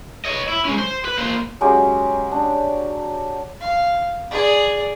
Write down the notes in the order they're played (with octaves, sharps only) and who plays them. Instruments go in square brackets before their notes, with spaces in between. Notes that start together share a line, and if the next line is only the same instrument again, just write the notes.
[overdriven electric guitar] C#5 D#5
E4
G#3 C#4
C5
B4
A#3 C5
[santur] F#3 G#3 C#4 G4
D4
[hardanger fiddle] F5
G#4 D5